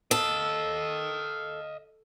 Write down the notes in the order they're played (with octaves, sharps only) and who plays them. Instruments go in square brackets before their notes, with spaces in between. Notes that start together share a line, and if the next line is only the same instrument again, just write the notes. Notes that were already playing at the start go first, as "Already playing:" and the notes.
[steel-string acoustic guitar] A4 [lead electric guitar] D#5 F5